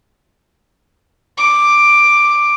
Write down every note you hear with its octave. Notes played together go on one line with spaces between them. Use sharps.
D6